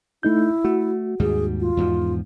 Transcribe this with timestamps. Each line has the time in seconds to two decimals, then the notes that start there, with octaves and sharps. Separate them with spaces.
0.23 A3 D#4 E4 G6
0.64 A3 F#4
1.20 D#2 G#2 G3 G#4
1.60 F4
1.77 E2 G#2 F3